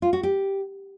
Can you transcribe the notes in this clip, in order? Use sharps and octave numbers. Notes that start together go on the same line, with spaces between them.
F4
F#4
G4